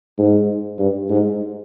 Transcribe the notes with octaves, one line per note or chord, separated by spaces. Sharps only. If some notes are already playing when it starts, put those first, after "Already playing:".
G#2
G2
G#2